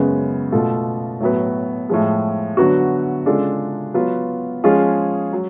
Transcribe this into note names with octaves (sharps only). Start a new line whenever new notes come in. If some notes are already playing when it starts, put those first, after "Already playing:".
Already playing: F#2 C#3 G#3 B3
B2 A3 F4 A4
A2 F#3 B3
A2 F3 G#3
D3 F#3 B3 F#4
C#3 G#3 D4 F4 A4
F#3 B3 F4 B4
F3 G#3 C#4 F4 G#4
F#3